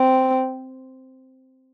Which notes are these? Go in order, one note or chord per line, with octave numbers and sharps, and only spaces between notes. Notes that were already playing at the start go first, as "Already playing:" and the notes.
Already playing: C4